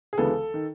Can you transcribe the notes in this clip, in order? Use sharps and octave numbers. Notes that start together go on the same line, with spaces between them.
G#4
D2 C#3 E3 G#3 B3 A4
D#3